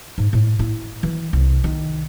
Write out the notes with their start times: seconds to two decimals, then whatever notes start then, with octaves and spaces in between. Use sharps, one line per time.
0.18 G#2
0.33 A2
0.59 E4
1.03 E3
1.33 C2
1.64 D#3